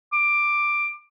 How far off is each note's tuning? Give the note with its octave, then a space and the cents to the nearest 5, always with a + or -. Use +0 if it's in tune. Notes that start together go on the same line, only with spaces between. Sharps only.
D6 +10